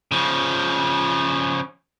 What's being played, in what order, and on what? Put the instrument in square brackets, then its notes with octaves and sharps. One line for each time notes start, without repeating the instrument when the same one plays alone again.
[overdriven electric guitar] C#3 F3